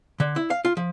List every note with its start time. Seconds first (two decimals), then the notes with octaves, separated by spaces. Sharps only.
0.20 D3
0.36 E4
0.50 F5
0.65 F4
0.77 F3